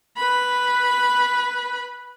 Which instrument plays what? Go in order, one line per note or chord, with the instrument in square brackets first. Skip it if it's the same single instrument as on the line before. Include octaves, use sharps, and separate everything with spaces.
[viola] B4 B5